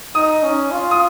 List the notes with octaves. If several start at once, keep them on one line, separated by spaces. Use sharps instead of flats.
D#4 D#6
C#4
F4
D#6